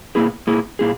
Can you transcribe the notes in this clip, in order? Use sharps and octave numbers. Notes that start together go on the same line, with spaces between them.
A#2 A#3 E4 G#4
A#2 A#3 E4 G#4
A#2 A#3 E4 G#4